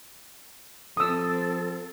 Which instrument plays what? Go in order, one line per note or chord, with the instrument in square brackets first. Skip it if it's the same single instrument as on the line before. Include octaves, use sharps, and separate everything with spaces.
[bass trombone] F3 [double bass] C4 [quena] A4 [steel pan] D#6 E6